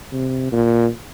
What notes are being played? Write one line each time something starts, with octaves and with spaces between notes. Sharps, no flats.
C3
A#2